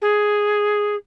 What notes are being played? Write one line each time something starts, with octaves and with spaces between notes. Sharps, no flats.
G#4